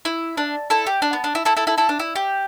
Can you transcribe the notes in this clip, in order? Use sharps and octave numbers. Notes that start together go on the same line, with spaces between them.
E4
D4
E4 A4
G4
D4
B3
D4
E4
E4 A4
E4 A4
E4 A4
E4 A4
D4
E4
G4